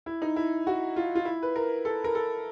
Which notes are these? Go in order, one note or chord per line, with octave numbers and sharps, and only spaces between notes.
E4
D#4
E4
F#4
F4
F4
E4
B4
A#4
A4
A#4
A4